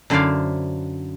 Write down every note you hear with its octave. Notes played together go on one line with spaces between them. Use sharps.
F#2 D3 E4 C5 D5 F5